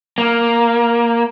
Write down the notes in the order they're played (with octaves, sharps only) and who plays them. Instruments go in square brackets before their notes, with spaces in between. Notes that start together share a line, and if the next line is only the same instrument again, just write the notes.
[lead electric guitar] A#3